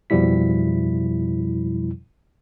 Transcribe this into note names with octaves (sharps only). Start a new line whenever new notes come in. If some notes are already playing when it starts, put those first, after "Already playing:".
F2 B2 F3 G3 E4 B6